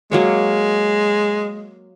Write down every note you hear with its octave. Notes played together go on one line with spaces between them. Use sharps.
F#3 G#3 A#3 C#5